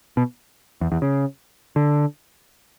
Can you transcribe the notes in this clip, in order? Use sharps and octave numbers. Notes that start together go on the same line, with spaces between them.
B2
E2
E2
C#3
D3